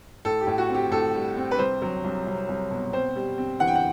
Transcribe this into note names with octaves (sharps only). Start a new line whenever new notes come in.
A2 A4
G4
A2
F#4
C4
G4
A2 A4
G3
C4
B4
C2 C5
F#3
C2
C2
C2
B2
C4 C5
G3
C4
E3 F#5
G5
F#5